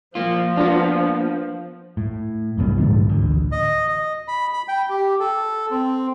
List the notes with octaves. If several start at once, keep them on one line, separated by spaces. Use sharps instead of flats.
F3 A#3 F4
A#3 B3 D4 F4
A2
F#1 C2 G2 B3
A#1 G#2 D3 F3
A1 D2
D#5
D#5
B5
B5
G5
G4
A4
C4